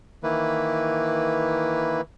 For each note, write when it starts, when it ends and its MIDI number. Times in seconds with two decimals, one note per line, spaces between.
0.23 2.01 51
0.23 2.01 52
0.23 2.01 58
0.23 2.01 64
0.23 2.01 71